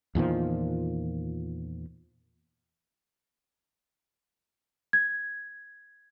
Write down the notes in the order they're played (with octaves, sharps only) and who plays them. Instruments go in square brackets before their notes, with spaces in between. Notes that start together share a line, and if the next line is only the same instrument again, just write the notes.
[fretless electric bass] E2 A#2 D#3 F3
[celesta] G#6